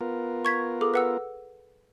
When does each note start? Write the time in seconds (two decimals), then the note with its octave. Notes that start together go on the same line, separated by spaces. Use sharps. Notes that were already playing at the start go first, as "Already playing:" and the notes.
0.01 B3 F4 A#4
0.45 C#6 G#6 B6
0.81 G#4 A4 D6
0.94 B4 F#5 E6